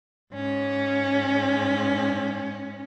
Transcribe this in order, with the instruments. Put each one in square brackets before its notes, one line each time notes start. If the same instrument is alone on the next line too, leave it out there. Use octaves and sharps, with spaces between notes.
[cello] G#2 C#4